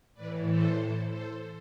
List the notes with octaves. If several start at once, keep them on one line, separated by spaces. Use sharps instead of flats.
A2 E3 B4 D5
A4 C5
A4 C5